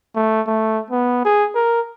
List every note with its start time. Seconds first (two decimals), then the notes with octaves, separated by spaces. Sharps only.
0.16 A3
0.47 A3
0.91 B3
1.25 G#4
1.55 A#4